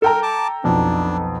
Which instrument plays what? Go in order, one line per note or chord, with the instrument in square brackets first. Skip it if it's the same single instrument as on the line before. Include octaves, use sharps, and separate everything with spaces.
[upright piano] A4 G5 A#5 [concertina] A#4
[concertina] A5 D6
[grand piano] B1 F2 B2 [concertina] D4